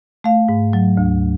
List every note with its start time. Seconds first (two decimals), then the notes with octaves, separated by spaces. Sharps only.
0.24 A3 F5
0.49 G#2
0.73 F#3
0.97 D2